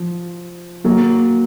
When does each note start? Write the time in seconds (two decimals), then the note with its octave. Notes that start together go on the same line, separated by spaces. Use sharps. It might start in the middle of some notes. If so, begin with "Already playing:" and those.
Already playing: F3
0.84 F#3 A#3